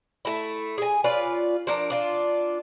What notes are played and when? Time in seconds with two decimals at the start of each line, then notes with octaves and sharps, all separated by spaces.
0.25 A3 E4
0.78 G#4 G#5
1.04 F4 B4 C#5 D5
1.67 F3 D4 A#4
1.90 D4 F4